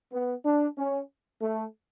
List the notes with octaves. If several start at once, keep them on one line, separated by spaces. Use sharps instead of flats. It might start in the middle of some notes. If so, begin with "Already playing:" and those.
B3
D4
C#4
A3